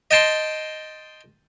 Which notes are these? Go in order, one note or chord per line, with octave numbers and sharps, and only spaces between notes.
D#5 G5 A5 C6